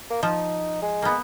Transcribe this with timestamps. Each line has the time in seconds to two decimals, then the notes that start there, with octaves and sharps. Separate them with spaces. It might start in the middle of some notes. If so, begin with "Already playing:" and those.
0.10 A#3
0.23 F3 D#4
0.82 G#3
1.02 A#3 B3